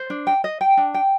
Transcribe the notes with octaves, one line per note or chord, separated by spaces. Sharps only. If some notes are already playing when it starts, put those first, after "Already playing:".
Already playing: C5
D4
G5
D#5
G5
D4
G5